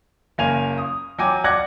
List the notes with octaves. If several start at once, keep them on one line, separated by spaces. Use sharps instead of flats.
F#1 A#3 G#5 F7
D#6
F#3 F#4 G5 G#5 D6
D5 F#5 D6 F#6 G#6 A#6